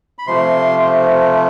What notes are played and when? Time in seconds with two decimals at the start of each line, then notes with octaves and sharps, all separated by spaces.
0.19 B5
0.27 C3 F3 A3 C6